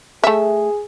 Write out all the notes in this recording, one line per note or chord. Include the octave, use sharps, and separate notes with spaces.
A3 G#4 E5